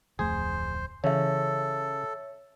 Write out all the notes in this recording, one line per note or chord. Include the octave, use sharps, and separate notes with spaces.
D1 F2 A3 G#4 C5
C#3 E3 A4 C#5 E5